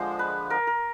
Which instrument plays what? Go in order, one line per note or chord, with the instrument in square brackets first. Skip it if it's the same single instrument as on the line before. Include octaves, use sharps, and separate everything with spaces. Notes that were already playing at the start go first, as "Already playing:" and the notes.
Already playing: [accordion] D3 F3 G#3 [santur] C5
[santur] B4
A#4
A#4